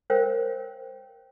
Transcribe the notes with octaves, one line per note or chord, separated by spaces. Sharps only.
A#4 C5 C#5 F5 G5